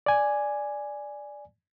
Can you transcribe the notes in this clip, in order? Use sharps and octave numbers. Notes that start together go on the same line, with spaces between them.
D5 G#5